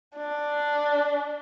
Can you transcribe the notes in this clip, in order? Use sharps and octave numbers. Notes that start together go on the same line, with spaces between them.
D4